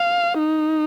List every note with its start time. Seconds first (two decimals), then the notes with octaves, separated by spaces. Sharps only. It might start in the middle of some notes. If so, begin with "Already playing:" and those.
Already playing: F5
0.38 D#4